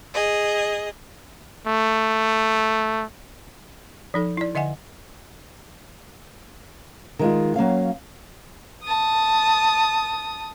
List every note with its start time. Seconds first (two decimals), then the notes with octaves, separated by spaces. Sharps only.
0.13 G#4 D#5
1.67 A3
4.14 F3 D#4 A4
4.37 E4 D5
4.55 D3 D#5 E5 F#5 G#5
7.19 D#3 G#3 F4
7.56 F#3 A#3 C#4 F5
8.84 A5 D#6